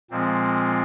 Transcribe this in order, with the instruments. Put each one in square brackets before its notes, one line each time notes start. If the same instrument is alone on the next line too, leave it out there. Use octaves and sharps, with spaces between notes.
[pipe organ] A#2 F3 G#3 C4